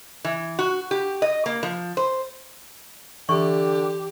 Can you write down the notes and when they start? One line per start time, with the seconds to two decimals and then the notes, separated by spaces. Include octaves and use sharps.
0.24 E3
0.59 F#4
0.91 G4
1.22 D#5
1.46 A#3
1.63 F3
1.97 C5
3.29 D3 E3 G4 C#6